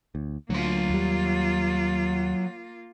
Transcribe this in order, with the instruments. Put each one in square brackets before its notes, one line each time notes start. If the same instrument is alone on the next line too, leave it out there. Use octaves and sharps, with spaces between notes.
[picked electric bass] D2
[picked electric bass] D2 [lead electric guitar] F#3 C6 [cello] A#3 F4
[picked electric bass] D#2 G3